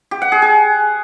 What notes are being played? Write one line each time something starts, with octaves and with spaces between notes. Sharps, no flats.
G4
F#5
G#4
G#4